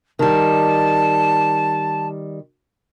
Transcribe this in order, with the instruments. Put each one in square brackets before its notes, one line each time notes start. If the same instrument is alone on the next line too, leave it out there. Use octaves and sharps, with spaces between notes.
[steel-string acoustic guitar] D#3 G3 [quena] A5